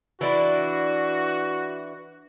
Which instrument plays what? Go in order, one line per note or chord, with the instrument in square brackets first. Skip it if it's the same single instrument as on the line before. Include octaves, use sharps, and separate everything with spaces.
[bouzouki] E3 D4 E4 [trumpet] F#4